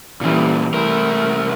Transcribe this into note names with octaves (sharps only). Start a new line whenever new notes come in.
A#2 E3 G3 A#3 C#4
C2 A3 A#4